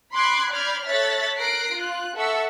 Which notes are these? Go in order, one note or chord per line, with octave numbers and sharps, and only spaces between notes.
B5 C6 D6 F#6 G#6 C7
D5 B5 F6 G6 G#6 C7
A4 C#5 E5 F#6 A6 B6
A#4 F#6 A#6 C7 D7
F4 F#6
A4 E5 F#5 C#6 E6